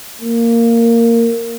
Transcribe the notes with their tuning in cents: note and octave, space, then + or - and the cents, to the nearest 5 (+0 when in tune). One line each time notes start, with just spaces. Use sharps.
A#3 -10